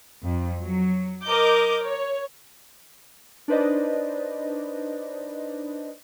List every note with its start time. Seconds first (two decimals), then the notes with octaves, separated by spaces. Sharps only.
0.23 F2
0.59 F#3
1.25 A#4 D#5 D6 G6
1.84 C#5
3.48 D4 D#4 B4 C5 D5 D#5